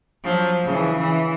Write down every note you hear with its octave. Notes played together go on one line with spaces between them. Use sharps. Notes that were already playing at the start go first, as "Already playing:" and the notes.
F3 F#3
C#3 E3
E3